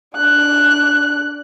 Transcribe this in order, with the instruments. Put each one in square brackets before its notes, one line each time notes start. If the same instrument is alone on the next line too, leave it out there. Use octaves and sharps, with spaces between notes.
[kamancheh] D4 F#6